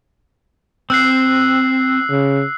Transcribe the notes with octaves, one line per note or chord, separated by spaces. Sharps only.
C4 E6 F#6 C7
C#3